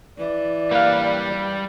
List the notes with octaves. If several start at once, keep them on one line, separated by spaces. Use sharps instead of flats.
E3 D5
G3 A#3 B4 F5